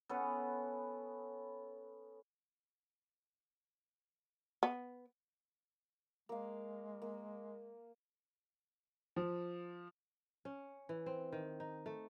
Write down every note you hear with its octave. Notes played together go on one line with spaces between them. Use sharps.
B3 C#4 A4 B4
B3
G#3 A#3 F5
A#3
F3
C#4
E3
C4
D#3
D#4
A3